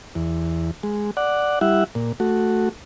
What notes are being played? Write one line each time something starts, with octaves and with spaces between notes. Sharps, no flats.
E2
G#3
D5 F#5
G3 E4 E5 F#5
A#2
A3 F#4